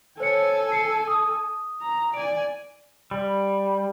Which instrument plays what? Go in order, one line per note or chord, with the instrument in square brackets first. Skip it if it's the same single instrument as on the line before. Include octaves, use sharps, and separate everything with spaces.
[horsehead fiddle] A4 G#5 [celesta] C5 C#5 C#7
[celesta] C7 C#7
D#6
[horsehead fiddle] A#5
[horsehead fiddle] D5 G#5 [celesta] D7
[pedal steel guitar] G3